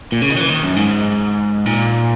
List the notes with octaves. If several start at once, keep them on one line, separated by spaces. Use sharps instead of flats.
A#2
C#3
D#3
F#3
E3
D#3
F#2
G#2
A#2